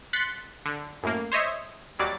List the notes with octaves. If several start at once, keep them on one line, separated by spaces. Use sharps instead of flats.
C6 F#6 A6 B6 C#7
D3
F#2 A2 A#3
C5 C#5 D#5 E5
D#2 F#3 G3 D5 A6